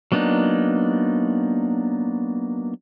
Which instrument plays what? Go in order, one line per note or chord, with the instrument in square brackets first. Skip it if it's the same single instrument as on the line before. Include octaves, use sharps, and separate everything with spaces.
[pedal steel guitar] F#3 A#3 B3 D4 D#4